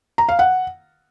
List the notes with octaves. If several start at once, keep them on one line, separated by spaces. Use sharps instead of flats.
A#5
F5
F#5